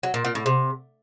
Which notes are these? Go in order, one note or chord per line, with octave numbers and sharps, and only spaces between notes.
F#3
A#2
A#2
A2
C3